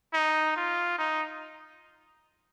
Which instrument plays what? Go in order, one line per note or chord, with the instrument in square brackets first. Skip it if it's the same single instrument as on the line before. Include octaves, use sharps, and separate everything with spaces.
[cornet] D#4
F4
D#4